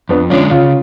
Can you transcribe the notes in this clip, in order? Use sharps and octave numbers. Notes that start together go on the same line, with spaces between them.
F2 B3 D4
D3 G#3 C#4 D4 F4
C#3 C#4 F4